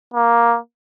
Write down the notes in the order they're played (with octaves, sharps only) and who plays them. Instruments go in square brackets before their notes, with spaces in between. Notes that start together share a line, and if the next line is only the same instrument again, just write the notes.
[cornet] A#3